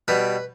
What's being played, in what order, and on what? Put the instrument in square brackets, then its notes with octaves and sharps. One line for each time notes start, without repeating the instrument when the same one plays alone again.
[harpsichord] B2 G3 B4